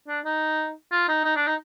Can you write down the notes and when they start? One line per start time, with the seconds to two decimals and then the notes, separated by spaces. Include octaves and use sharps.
0.08 D4
0.24 D#4
0.92 F4
1.08 D#4
1.24 D#4
1.36 D4
1.47 D#4